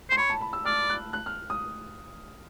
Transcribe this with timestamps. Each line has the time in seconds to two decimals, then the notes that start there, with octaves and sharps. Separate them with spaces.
0.10 C5 C6
0.17 C#5 B5
0.30 A5
0.41 B5
0.53 E6
0.66 D5 F6
0.90 F#6
1.13 F#6
1.26 F6
1.50 D#6